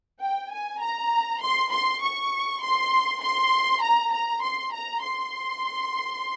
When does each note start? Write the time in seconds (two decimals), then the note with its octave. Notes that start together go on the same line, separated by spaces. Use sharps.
0.21 G5
0.51 G#5
0.81 A#5
1.42 C6
1.71 C6
2.02 C#6
2.61 C6
3.22 C6
3.82 A#5
4.12 A#5
4.42 C6
4.73 A#5
5.02 C6